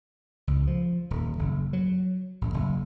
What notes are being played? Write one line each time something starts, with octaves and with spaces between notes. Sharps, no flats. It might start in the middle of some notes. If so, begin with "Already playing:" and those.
C#2
F3
D#1
F#1
F#3
A1
F#1